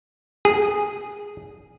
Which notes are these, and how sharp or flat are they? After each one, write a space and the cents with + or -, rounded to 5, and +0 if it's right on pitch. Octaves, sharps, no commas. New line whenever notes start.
G#4 -10